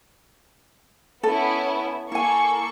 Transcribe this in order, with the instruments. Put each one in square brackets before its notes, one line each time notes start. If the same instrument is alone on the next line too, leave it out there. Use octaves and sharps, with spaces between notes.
[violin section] B3 C#4 E4 [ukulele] A4
[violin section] A#3 A4 C#6 [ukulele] E4 G#5